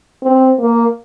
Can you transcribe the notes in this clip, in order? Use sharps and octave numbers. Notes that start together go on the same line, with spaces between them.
C4
A#3